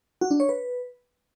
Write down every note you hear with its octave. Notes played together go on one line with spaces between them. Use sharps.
F#4
D4
C#5
B4